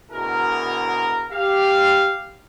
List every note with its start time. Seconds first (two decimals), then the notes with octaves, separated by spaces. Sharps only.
0.12 D2 B2 E4 G#4 A#4
1.32 G4 F5